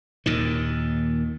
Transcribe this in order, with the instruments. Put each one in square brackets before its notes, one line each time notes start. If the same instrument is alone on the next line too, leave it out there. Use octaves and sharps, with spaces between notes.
[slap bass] D#2 A#2 D#3